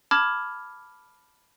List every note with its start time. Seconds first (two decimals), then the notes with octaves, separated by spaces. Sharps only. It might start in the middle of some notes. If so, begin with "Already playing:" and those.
0.11 A5 B5 D6 F6 G#6